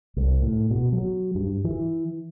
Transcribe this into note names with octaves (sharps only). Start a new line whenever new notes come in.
C2
A2
B2
F#3
G2
E3